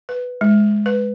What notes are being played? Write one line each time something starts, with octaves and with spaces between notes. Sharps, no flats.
B4
G#3
B4